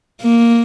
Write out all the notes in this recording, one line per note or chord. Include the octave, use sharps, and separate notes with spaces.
A#3